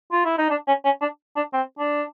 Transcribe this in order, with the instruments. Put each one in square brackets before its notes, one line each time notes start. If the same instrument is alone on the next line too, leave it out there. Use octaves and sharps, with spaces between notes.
[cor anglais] F4
E4
D#4
D4
C#4
C#4
D4
D4
C4
D4